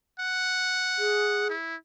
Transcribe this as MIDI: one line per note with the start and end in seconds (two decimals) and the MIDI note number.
0.20 1.49 78
0.98 1.50 68
1.50 1.76 64